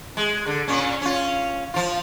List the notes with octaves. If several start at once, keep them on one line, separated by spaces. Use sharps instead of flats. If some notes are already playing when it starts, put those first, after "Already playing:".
G#3
D3
A#2 C#4
C#4 F4
F3 F4